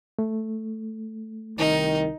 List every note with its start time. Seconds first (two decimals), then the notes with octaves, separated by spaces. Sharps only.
0.19 A3
1.59 C2 D#3 D#4